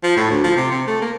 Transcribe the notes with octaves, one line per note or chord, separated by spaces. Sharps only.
F3
A2
D2
F3
C3
C3
A3
A#3